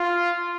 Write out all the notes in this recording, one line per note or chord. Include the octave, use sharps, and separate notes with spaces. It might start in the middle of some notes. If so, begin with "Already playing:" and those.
Already playing: F4